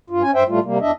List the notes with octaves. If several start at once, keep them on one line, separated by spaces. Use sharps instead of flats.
G2 F4
C#4 G#5
G2 C5 E5 G5
A2 G3 A3 F4
C3 G3 A#3
E2 D4 D#5 E5